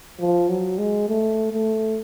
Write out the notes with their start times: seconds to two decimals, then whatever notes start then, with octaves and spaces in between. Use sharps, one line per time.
0.20 F3
0.49 F#3
0.78 G#3
1.08 A3
1.53 A3